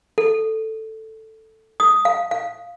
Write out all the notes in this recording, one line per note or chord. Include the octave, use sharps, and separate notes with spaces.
A4
D#6
F5
F5